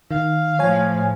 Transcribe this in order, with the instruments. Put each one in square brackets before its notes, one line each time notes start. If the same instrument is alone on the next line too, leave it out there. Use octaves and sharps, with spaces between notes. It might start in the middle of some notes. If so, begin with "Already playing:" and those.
[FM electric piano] D#3 [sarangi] F5
[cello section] A2 F3 [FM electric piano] C#5 G#5